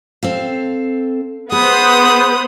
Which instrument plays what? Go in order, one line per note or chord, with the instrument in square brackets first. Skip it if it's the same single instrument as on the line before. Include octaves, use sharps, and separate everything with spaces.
[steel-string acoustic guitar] C4 A4 F5
[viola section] B3 C5 [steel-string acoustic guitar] G#4 [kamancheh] F#5 B5 [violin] D#6